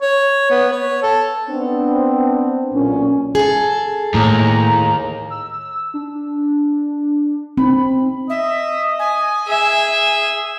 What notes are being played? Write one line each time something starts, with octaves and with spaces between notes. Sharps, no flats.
C#5
B3
C#5
A4
B3 C4 D4
B1 A#2 C#4
G#4 A4
D#2 A2 A#5
E6
D4
C4 D#4 B5
D#5 E5
G#5
G#4 E5